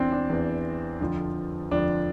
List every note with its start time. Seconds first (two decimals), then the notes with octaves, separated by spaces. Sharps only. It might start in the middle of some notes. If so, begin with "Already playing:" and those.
Already playing: E2 E3 C4 D4
0.12 D4
0.30 E2 E3
1.01 F2 D3 F3
1.71 F2 D3 F3 D4